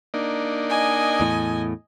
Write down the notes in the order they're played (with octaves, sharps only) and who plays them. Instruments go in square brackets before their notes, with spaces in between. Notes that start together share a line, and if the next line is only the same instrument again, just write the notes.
[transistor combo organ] A#3 D4 D#4
[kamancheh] D#5 G#5
[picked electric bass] E2 A2